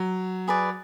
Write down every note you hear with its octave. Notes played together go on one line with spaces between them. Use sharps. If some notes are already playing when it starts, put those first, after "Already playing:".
Already playing: F#3
G#4 B4 D5